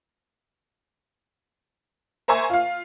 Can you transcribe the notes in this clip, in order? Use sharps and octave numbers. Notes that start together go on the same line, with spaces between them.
A#4 C5 E5 G#5 C#6
F4 F5